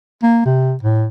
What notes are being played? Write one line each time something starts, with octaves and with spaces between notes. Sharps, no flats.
A#3
C3
A2